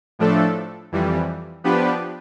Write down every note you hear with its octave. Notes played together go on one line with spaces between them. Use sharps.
A2 F3 A3 D4 A4
F2 E3 G3
F3 B3 D4 G4 B4